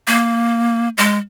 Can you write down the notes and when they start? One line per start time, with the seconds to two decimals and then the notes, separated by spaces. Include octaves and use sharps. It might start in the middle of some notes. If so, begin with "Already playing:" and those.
0.07 A#3
0.97 G#3